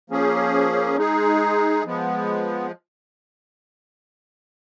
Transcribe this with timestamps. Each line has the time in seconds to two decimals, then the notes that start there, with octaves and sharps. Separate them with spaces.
0.10 F3 A#3 C#4 G#4
0.97 G#3 D#4 G#4
1.85 F3 G#3 B3